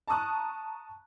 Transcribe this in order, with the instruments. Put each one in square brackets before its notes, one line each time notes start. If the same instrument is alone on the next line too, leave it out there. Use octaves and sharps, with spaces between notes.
[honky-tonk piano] A5 A#5 C#6 D#6 F#6